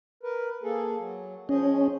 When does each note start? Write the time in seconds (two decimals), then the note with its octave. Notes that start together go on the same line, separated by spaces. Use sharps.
0.23 A#4 B4
0.63 A#3 G#4 A4
0.98 F#3
1.49 F3 C#4 G#4 D#5